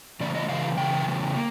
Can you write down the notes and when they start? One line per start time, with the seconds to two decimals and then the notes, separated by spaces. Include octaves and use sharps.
0.20 C#3 E3 A3 D5
0.35 D#5
0.48 C#3 E3 A3 F5
0.77 C#3 E3 A3 G5
1.06 C#3 E3 A3
1.35 A#3